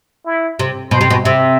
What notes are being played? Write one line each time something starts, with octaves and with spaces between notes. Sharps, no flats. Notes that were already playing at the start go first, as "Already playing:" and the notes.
E4
C3
B2 C5
C3
B2
C3 E5